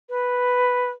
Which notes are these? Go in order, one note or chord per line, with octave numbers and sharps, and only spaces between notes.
B4